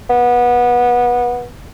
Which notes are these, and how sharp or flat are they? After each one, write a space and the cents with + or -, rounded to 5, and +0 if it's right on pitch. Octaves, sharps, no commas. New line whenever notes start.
B3 -20